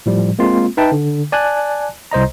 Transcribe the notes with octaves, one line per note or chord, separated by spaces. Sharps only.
A2 F3 G3
G#3 A#3 C4 F4
D#4 B4 E5 G5 A5
D3
D5 G#5 A5 F#6
C2 C5 D#5 A#5